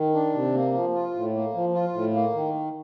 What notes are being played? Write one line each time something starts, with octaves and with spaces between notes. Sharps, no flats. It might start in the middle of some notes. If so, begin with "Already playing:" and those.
Already playing: D#3
D4
C3
A#3
F3
F4
A2
A#3
F3
F4
A2
A#3
D#3